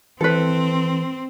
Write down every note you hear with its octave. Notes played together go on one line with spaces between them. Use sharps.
E3 C4 A4 B4